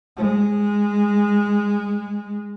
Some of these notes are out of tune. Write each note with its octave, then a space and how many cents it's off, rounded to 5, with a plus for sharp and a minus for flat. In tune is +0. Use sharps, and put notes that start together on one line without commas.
G#3 -15